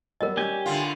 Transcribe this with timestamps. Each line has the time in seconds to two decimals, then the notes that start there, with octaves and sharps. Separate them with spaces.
0.21 F#3 G3 B3 A#4 D#5
0.37 G3 C#4 G4 G#5 G6
0.66 A2 D3 F4